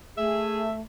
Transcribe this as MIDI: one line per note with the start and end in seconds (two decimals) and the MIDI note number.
0.18 0.80 57
0.18 0.63 68
0.18 0.73 76